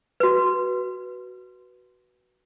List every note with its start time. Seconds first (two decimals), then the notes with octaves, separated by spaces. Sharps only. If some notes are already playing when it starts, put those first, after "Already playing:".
0.20 F#4 B4